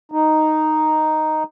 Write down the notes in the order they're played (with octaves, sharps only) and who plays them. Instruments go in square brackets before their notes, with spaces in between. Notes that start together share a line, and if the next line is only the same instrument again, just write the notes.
[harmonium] D#4